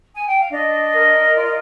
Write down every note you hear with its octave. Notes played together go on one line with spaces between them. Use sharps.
G#5
G5
F5
D4 D#5
A#4
F4 D5
D#5